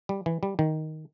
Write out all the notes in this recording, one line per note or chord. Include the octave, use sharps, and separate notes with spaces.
G3
E3
G3
D#3